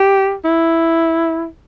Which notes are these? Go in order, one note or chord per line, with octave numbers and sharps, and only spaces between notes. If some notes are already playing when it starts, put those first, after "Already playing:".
Already playing: G4
E4